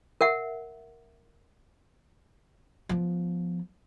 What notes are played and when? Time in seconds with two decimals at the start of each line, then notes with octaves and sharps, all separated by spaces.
0.21 A#4 E5 F#5
2.89 F3 B3